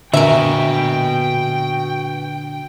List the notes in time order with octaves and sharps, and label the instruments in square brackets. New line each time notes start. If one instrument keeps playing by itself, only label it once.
[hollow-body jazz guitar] A#2 D3 [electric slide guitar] F#4 B4 G#5 [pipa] A#4 E5 [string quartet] G5